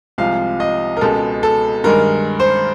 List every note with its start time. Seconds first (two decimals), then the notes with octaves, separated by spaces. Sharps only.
0.18 C2 C3 F3 G#3 F5
0.60 D#5
0.97 A#4
1.01 C#2 B2 G#3 A4
1.43 A4
1.84 G2 D#3 G#3 A#4
2.40 C5